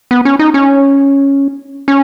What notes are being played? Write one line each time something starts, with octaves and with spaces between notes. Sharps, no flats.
B3
C#4
D#4
C#4
C#4